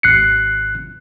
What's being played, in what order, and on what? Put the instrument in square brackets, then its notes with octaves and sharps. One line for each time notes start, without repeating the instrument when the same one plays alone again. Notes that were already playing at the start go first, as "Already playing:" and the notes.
[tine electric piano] G#1 F#6 C7 C#7